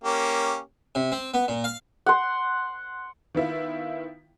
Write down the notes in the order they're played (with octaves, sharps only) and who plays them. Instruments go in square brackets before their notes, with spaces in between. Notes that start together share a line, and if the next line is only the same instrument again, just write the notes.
[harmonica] A#3 C#4 G4
[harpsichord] C3
C4
B3
A#2
F5
[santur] F#5 C6
[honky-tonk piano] D#3 B3 E4 F4